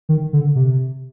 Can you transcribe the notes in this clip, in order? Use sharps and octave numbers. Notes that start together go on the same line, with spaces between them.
D#3
D3
C3